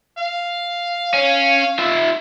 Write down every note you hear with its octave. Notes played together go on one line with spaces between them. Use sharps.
F5
C#4
F4 E5